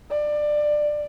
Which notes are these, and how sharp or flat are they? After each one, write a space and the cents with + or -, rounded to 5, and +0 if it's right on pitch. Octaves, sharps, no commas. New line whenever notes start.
D5 +20